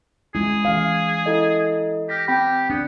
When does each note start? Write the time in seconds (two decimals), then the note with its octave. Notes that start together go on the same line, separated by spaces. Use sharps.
0.35 G#3 C#4 E4 G#4
0.65 E3 C#4 F5
1.26 E4 A4 D#5
2.09 G4 F6 A#6 B6
2.28 C4 G4 G5 B5
2.70 B3 D4